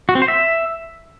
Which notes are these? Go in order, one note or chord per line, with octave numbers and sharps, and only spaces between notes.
F#4
C4
C5
E5